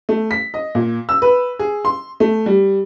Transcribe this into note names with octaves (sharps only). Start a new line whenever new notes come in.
A3
B6
D#5
A#2
E6
B4
G#4
C6
A3
G3